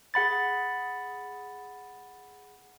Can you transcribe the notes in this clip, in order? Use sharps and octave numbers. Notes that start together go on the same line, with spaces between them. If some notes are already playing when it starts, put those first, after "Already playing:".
G#4 F#5 B5 A6